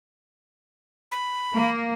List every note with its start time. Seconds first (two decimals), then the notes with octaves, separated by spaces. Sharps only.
1.12 B5
1.53 A#3